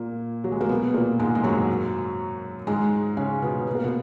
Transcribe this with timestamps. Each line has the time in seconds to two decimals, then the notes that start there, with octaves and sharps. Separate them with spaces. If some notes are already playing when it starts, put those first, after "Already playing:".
Already playing: A#2 A#3
0.44 F#3
0.52 G#3
0.61 A#3
0.69 B2 B3
0.94 A#2 A#3
1.20 G#2 G#3
1.35 G#3
1.44 F#2 F#3
2.67 G#2 G#3
3.17 C#3 C#4
3.42 B2 B3
3.67 B3
3.75 A#3
3.84 B2 B3